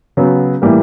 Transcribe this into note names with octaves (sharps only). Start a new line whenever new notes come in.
C#3 F#3 B3
A2 E3 G3 A#3